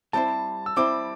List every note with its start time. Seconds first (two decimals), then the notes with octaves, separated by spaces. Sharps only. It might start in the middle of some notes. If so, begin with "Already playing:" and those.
0.13 G3 C4 E4 C5 A5
0.66 E6
0.76 G3 C4 E4 C5 D6